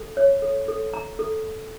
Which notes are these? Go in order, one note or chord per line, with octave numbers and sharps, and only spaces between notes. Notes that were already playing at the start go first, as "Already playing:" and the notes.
Already playing: A4
C#5
A4
A4
A#5
A4